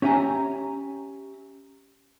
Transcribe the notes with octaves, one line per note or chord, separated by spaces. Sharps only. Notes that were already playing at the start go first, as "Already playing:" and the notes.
C#4 G4 E5 G#5 A#5